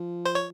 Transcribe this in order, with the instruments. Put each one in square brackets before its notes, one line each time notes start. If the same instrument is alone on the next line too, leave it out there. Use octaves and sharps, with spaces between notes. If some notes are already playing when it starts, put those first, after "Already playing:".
Already playing: [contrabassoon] F3
[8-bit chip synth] C5
C#5